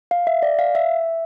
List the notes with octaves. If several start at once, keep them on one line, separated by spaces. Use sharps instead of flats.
F5
E5
D5
F5
E5